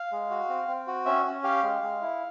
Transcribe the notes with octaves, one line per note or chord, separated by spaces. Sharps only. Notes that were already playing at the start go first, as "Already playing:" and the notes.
Already playing: F5
G#3
F#4
C4
C4
F#4
C#4 E5
C#4
G4 F5
G#3
G#3
E4